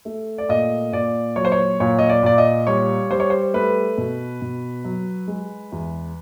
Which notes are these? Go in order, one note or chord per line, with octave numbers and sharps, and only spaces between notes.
A3
D5
A#2 D#5
A#2 D5
F#3 C#5
C5
C#5
A#2 C#5
D#5
D5
A#2 D5
D#5
G3 C#5
G3 C5
C#5
C5
A3 B4
B2
B2
F#3
G#3
E2